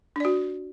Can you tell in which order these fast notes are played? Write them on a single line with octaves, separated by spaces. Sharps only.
D4 D5 F#4